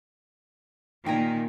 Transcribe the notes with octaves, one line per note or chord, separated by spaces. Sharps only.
A#2 D#3 G5 G#5 A#5